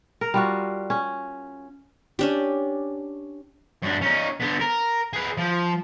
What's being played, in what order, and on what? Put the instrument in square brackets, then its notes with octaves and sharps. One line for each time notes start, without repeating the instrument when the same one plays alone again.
[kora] A#4
G3 F4 F#4
C#4
[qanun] C#4 D4 G4
[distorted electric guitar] F#2 D4
C#4 D#4
D3 B3
A#4
G#4 B4
F3